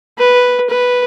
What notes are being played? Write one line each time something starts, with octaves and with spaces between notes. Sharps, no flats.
B4
B4